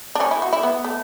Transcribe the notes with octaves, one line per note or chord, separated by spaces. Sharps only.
D4
C#4
E4
F#4
E4
B3
A3